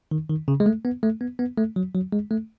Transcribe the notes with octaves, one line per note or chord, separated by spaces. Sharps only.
D#3
D#3
C#3
G#3
A3
B3
A3
B3
B3
A3
F#3
F#3
G#3
A3